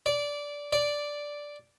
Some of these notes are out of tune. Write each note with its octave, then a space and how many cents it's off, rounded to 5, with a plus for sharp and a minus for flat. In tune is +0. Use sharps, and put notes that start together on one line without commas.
D5 -15
D5 -5